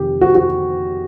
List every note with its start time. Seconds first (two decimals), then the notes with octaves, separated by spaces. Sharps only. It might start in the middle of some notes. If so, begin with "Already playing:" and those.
Already playing: F2 C3 D#3 G4
0.21 F#4
0.35 F#4